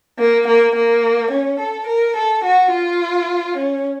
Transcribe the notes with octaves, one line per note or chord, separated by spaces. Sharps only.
A#3
A#3
A#3
C#4
A4
A#4
A4
F#4
F4
C#4